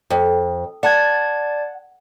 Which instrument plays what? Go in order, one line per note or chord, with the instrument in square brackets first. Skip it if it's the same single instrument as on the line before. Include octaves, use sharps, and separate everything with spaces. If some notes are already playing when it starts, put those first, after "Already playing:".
[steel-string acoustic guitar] F2
[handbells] D5 A5 G#6 [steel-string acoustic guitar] F#5